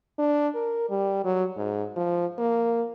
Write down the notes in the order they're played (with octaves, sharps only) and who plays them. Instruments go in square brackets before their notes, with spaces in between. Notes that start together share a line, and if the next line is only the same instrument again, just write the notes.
[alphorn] D4
A#4
G3
F#3
G#2
F3
A#3